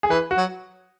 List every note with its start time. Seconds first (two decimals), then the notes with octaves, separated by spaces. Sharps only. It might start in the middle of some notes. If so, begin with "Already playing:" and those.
0.03 G#4
0.10 E3 B4
0.31 F#4
0.37 F#3